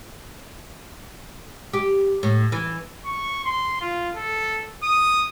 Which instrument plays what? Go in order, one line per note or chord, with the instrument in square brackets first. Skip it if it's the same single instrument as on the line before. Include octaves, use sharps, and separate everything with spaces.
[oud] G4
A2
E3
[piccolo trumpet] C#6
C6
F4
A4
D#6